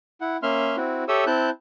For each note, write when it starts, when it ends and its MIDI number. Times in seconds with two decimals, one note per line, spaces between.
0.21 0.37 64
0.21 0.37 78
0.43 0.76 58
0.43 0.76 61
0.43 0.76 76
0.43 0.76 84
0.43 0.76 89
0.77 1.04 60
0.77 1.04 64
0.77 1.04 66
1.08 1.25 67
1.08 1.25 69
1.08 1.25 73
1.08 1.25 76
1.08 1.25 87
1.08 1.25 88
1.27 1.50 60
1.27 1.50 64
1.27 1.50 81
1.27 1.50 90
1.27 1.50 91